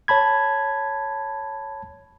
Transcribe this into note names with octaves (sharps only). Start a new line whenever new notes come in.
C#5 A5 B5 G#6